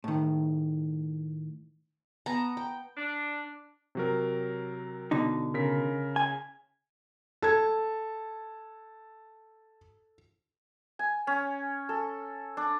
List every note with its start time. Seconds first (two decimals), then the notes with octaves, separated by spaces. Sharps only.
0.04 A2 D#3
2.26 B3 A5 A#5
2.57 G5
2.96 D4
3.95 C3 F#3 A#4
5.11 B2 D3 D#4
5.54 C#3 A#4 B6
6.16 G#5
7.42 A4 A5 G#6
10.99 G#5
11.27 C#4
11.89 A4
12.57 D4